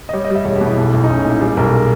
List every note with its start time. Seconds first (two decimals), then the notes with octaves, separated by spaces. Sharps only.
0.09 D#5
0.13 G3 C#5
0.25 D#5
0.30 G3
0.35 E5
0.45 E1 C#5
0.56 G4
0.61 B2
0.66 E4
0.77 B1
0.93 B1
1.04 D#4
1.09 B1 C#4
1.25 A#2
1.30 E4
1.40 G3 G#4
1.57 B1 A#4
1.73 G#4